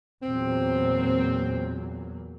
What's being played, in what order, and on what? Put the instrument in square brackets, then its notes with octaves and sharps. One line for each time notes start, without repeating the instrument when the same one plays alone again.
[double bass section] E2 A#2 F#3 [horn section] C4